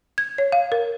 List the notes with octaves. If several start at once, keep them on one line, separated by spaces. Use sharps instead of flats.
G#6
C#5
F5
A#4